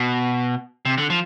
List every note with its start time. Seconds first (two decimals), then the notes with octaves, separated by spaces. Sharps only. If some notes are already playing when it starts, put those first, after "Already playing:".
Already playing: B2
0.85 C3
0.98 D3
1.10 F3